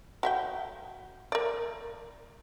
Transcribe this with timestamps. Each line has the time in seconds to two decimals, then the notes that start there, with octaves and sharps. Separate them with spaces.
0.23 F#4 E5 G5
1.32 A#4 D5